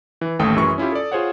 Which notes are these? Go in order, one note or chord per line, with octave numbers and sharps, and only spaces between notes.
E3
A1 D#2 A3 G5 D#6
F#2 E3 G#3 C#6
C#4 E4 F4 G4
A4 D5
F4 G#4 C5 C#5 F#5